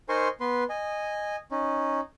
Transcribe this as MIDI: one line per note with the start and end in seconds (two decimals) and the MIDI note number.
0.09 0.28 63
0.09 0.28 70
0.09 0.28 72
0.09 0.28 80
0.09 0.28 84
0.09 0.28 85
0.40 0.64 59
0.40 0.64 71
0.40 0.64 84
0.69 1.36 75
0.69 1.36 80
1.51 2.00 61
1.51 2.00 63